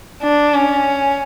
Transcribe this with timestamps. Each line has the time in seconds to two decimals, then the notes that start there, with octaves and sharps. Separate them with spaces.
0.23 D4
0.54 C#4